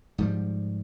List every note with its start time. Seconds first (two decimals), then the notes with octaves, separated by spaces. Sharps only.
0.18 G#2 F3 G3